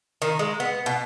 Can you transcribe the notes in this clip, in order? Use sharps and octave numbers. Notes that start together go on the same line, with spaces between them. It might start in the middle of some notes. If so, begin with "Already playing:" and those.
D#3
G#3
B3
B2